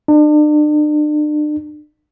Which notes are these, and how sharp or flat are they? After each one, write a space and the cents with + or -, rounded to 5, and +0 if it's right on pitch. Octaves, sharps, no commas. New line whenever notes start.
D4 +40